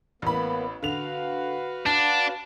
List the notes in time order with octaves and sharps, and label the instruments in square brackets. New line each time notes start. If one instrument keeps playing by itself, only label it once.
[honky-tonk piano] A1 B5 [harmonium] A#3 B3
[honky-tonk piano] D3 F7 [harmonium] F#4 B4 F5
[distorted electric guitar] D4 [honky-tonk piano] A5